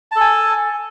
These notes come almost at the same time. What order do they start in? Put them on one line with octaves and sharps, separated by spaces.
A5 A4 G#5